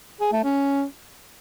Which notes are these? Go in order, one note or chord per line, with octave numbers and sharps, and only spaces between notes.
G#4
A3
C#4